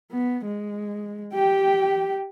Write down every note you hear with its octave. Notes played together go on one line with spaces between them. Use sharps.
B3
G#3
G4 G5